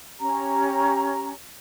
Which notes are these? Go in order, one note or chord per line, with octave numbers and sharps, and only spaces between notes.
C#4 G4 A#5